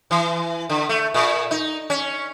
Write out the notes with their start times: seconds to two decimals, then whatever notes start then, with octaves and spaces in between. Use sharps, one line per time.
0.11 E3
0.69 D3
0.89 A3
1.14 A#2
1.51 D#4
1.90 C#4